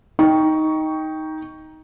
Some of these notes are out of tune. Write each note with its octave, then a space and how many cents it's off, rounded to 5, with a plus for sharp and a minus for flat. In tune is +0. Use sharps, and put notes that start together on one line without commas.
D#4 +10 G5 +0 C#6 +10